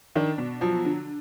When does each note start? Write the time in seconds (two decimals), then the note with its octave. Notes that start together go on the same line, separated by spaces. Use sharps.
0.16 D#3 D4
0.38 B2
0.61 F3 F#3
0.85 D3